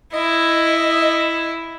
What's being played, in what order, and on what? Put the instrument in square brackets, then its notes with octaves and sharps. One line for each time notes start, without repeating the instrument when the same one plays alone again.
[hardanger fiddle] E4 [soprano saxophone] D#5